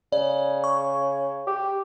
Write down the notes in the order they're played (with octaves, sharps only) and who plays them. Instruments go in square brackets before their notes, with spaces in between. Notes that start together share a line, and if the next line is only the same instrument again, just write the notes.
[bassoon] C#3 [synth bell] D5
[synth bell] C#6
[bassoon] G4